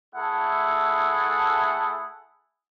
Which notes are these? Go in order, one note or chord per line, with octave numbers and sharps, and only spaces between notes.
A3 E4 G#4 A4 F#5